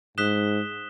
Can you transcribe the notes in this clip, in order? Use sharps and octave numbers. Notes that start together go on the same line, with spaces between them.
G#2 D#6 F#6 B6 E7 G7